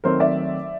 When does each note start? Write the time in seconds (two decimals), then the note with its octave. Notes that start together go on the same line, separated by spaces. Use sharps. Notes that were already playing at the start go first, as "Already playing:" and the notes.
0.04 D#3 F#3 A3 C4 A#4 C5
0.20 D5 E5